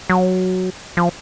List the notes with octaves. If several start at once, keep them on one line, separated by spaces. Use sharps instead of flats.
F#3
F3